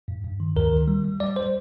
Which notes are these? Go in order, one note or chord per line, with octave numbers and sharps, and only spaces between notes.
G2
G2
D#3
D2 A#4
D#3
G3
G3
G3 D5
C5